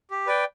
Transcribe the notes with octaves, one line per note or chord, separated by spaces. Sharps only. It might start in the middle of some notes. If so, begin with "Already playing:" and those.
G4
B4 D5 G5